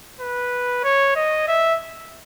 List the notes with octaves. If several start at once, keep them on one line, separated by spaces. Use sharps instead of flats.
B4
C#5
D#5
E5